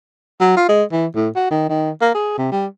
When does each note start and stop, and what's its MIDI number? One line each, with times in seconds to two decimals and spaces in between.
0.40 0.56 54
0.57 0.65 65
0.69 0.83 56
0.92 1.06 52
1.15 1.29 45
1.36 1.49 66
1.50 1.66 51
1.69 1.90 51
2.01 2.12 58
2.14 2.34 68
2.38 2.50 48
2.52 2.66 55